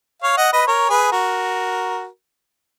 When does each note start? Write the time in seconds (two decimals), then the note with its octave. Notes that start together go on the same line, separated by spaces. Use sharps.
0.22 C#5 F5
0.37 D#5 F#5
0.52 B4 D#5
0.67 A#4 C#5
0.89 G#4 B4
1.12 F#4 A#4